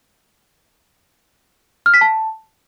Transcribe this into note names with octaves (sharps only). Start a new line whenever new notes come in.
F6
B6
A5